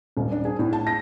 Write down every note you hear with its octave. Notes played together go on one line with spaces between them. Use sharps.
D#1
D4
G#4
A2
A5
A#6